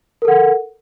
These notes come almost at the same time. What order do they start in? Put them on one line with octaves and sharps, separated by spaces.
A#4 A4 F#5